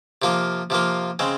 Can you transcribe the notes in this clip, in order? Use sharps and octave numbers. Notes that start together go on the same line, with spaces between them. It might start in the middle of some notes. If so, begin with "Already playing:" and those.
C3 F3 A#3 F4
C3 F3 A#3 F4
C#3 G#3 C4